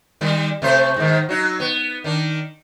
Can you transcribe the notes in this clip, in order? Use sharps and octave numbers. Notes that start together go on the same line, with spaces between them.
D#3 G3
C3 A3 C5
G#2 D#3
F#3 D#4
B3
D#3 D4